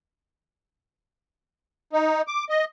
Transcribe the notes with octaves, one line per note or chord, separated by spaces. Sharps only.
D#4
D6
D#5